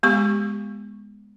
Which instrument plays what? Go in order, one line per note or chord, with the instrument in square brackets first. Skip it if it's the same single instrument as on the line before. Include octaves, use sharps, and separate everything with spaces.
[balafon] G#3 B3 G4 C#6